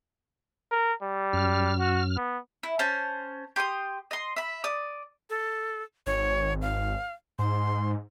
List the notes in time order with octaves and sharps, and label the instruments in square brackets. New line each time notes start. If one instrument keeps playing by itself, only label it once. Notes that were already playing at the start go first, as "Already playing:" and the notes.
[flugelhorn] A#4
G3
[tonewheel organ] F#2 F6
[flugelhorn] F#4
B3
[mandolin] E4
C#4 C5 A5
G4 C6 C#6 D#6
D#5 C6
E5 B5
D5 D#6
[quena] A4
[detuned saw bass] G#1 [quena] C#5
[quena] F5
[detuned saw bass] G#2 [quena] C6